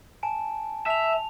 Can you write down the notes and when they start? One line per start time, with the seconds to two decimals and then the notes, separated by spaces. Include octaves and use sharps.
0.23 G#5 A5 D7
0.86 E5 A5 F7